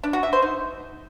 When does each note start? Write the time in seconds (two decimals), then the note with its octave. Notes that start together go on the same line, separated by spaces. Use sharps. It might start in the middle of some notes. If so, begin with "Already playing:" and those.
0.03 D4
0.13 F#4
0.23 E5
0.33 C5
0.42 D#4